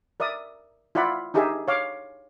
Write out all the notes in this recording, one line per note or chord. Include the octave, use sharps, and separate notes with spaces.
A#4 D5 E5 D#6
E4 F4 D5 F#5 B5
D4 D#4 G4 G#4 A#4 E5
C#5 F5 D6